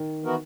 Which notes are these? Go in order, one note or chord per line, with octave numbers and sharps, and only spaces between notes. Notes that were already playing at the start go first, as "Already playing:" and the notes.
Already playing: D#3
E3 B3 F#4 A#4